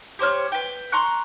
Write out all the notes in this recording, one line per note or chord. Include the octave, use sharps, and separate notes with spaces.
G4 C5 C#5 F6
B4 G5
A#5 C6 C#6 F#6